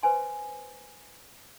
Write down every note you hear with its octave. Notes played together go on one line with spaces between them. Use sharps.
B4 C5 G#5 C6